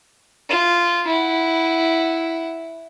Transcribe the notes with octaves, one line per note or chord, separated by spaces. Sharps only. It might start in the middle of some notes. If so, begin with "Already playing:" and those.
F4
E4 F#5